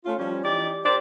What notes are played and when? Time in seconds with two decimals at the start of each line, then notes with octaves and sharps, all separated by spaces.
0.05 A3 C#4 F4
0.18 F3 G3 C#4
0.43 E3 D#4 G4 D5
0.85 G4 A#4 C5 D5